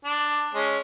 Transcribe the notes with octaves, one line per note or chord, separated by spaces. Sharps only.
D4
G#3 C#4